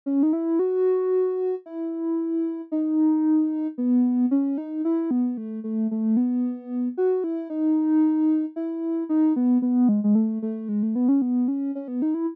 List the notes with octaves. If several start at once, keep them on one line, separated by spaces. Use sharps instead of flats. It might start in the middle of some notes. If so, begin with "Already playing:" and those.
C#4
D#4
E4
F#4
E4
D#4
B3
C#4
D#4
E4
B3
A3
A3
A3
B3
F#4
E4
D#4
E4
D#4
B3
B3
G#3
G#3
A3
A3
G#3
A3
B3
C#4
B3
C#4
C#4
B3
D#4
E4